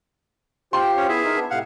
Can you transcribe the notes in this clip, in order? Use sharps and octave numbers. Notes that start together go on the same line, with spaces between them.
F4 G4 C5 G5 C6
C#4 C#5
B3 E4 G#4 E5
D#4 A#4
B3 D4
A2 C3 F5 F#5